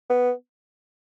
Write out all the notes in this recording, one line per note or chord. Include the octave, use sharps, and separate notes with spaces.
B3